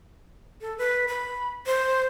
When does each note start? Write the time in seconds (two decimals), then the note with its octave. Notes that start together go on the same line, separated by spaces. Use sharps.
0.61 A4
0.78 B4
1.08 B5
1.66 C5